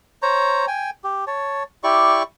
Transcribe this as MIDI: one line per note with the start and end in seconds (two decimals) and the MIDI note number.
0.22 0.66 72
0.22 0.66 73
0.22 0.66 82
0.68 0.90 79
0.68 0.90 80
1.04 1.25 67
1.27 1.63 73
1.27 1.63 81
1.84 2.23 64
1.84 2.23 67
1.84 2.23 74
1.84 2.23 85